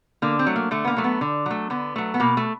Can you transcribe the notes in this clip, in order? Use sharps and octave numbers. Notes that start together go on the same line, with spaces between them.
D3 A#3
C4
F#3 A3
A#3
D3 A3
B3
A#3
F#3 A3
B3
D3
F#3 A3
D3 B3
F#3 A3
B3
B2 A#3
A3